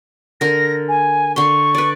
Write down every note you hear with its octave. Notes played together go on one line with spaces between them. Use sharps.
D3 A#4 A#6
G#5
D3 C6 C#6
B4 D5